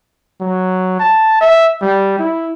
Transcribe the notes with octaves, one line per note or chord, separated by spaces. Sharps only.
F#3
A5
E5
G3
E4